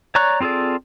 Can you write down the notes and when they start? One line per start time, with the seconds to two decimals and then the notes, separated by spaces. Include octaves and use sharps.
0.15 C#5 D5 A#5 C#6 F#6
0.40 C4 F4 G#4 A4 D5